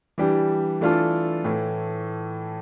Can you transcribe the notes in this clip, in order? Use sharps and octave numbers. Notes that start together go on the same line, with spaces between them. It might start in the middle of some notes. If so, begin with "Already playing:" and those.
E3 G3 D4 G4
E3 A3 D4 F4 A4
A2 E3 A3